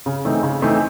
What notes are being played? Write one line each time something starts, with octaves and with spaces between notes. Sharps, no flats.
C#3
E3 A3 C4 D#4
C#3
E3 A3 C4 D#4